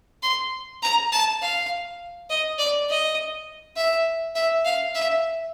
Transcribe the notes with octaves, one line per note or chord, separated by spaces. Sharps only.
C6
A#5
A5
F5
D#5
D5
D#5
E5
E5
F5
E5